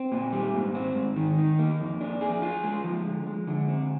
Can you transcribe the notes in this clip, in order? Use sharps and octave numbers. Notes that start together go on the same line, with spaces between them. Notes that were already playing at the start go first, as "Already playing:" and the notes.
Already playing: C4
A#2
G3
G#2
C4
G#2
D#3
D#4
A#3
F2
D4
G#4
F4
G#3
F3
D3
G#3
D3
C4